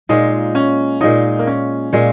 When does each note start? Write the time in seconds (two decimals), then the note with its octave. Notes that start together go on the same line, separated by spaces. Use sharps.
0.09 A#2 G#3 D#4 F4 C#5
0.55 C#4
1.00 A#2 G#3 D#4 F4 C#5
1.39 A#3
1.47 C#4
1.93 A#2 G#3 F4 C#5